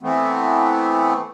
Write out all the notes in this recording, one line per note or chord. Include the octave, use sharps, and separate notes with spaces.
E3 A3 B3 C4